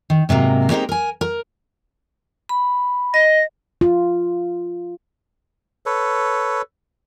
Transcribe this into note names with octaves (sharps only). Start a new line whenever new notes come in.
D#3
G#2 C3 F#3 A#3
G#3 A#3 C4 D#4 G4
A#4 G#5
A#4
B5
D#5 A#6
F4
A4 B4 C#5